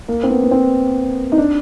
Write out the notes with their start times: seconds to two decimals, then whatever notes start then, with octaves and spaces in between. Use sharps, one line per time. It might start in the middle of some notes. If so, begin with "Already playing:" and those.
0.08 A#3
0.23 C4
0.30 B3
0.43 B3
0.51 C4
1.32 D#4
1.38 D4